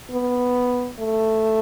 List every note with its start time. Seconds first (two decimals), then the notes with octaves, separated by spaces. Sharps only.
0.11 B3
1.00 A3